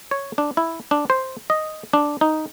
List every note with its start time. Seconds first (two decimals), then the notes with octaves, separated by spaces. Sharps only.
0.11 C#5
0.38 D4
0.57 E4
0.91 D4
1.10 C5
1.50 D#5
1.93 D4
2.21 D#4